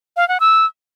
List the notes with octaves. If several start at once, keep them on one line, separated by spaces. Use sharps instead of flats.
F5
F#5
E6